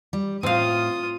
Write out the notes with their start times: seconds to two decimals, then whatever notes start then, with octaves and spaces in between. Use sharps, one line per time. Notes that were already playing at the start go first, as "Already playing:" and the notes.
0.13 G3
0.43 A2 C4 F4 F5 D#6